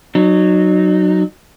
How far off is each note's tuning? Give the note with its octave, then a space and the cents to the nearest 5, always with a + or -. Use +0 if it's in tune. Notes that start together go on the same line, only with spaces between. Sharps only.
F#3 +0 D#4 -30